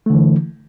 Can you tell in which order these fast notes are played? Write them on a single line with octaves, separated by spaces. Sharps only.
A3 D3 E3